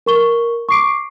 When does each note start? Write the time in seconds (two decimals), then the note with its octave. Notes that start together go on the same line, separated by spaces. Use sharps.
0.06 A#4 C#6 G7
0.69 C#6 D6 C7 D7